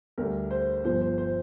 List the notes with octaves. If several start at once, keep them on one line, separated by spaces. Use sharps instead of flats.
D2 D3 G3 A#4
C5
G1 G2 F3 C5
C5
C5